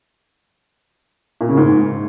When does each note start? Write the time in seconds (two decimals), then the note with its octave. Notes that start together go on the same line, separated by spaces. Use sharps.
1.41 A#2
1.49 C#3
1.57 G#2